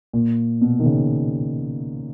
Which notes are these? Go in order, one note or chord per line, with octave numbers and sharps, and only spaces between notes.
A#2
B2
D#3
C#3